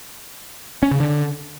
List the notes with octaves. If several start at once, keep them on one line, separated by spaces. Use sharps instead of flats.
C#4
C#3
D3